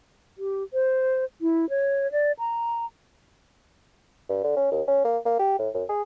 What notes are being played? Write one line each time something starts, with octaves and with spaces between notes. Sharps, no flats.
G4
C5
E4
C#5
D5
A#5
G2
D3
C#4
D#2
C#4
A#3
A#3
G4
A2
F#2
G#4